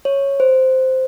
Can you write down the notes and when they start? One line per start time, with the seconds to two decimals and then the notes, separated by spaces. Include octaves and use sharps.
0.05 C#5
0.40 C5